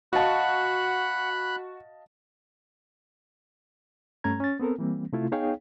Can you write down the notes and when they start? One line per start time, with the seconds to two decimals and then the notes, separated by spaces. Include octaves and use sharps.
0.13 F#4 D#5 F5 F#5 A5 B5 F#6
4.24 G2 A3 C#4 A#5 G#6
4.40 C#4 A6
4.60 B3 C4 A4 A#4
4.78 E3 G3 A#3 C4
5.13 C3 A3 E4 F4
5.32 B3 D#4 G#4 C#5 F5 G5